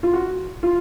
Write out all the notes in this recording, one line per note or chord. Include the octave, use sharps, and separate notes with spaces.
F4
F#4
F4